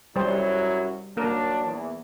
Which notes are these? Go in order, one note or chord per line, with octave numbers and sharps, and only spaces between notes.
F#2 F#3 G3 E4 C5
F#3 A#3 D4 A#4
E2